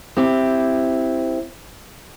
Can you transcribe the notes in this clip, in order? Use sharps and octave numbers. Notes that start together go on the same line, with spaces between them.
C4 E4 G4